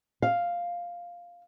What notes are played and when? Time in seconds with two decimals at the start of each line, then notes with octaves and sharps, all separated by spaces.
0.22 F5